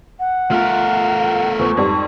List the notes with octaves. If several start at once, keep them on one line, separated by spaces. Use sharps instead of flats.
F#5
A3 F4 A#4
E2 F3 C#6
F2 G#2 G3